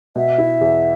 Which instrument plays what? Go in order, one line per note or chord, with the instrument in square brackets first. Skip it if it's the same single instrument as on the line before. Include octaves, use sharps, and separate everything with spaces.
[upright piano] B2 [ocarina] E5
[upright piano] E4
E2